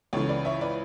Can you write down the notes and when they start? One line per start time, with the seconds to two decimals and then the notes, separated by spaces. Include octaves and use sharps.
0.13 C#2 C#3 E3 A4 C#5
0.29 B4 D5
0.45 C#5 E5
0.61 B4 D5